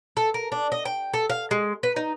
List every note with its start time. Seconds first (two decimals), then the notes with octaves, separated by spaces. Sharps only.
0.17 A4
0.34 A#4
0.52 D4
0.72 D#5
0.85 G5
1.14 A4
1.30 F5
1.51 G#3
1.83 B4
1.96 D#4